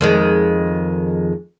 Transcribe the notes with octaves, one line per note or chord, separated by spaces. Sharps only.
F2 D#3 G#3